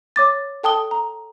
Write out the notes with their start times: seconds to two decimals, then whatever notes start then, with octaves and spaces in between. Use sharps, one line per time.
0.16 C#5 D6 A6
0.63 A4 G5 A5 D#6 G7
0.91 A#5